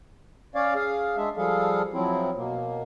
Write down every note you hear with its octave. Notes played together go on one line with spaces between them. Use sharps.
C#4 C#5 D5 F5
G#4 F5
G#3 D4 G#4 E5
F3 G3 G#4 A4 F5
F3 F#3 C4 E4
B2 A#3